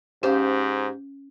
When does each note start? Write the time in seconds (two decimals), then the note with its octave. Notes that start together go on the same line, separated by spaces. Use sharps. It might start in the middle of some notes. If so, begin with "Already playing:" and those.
0.23 G#2 C#4 G4 C5 F5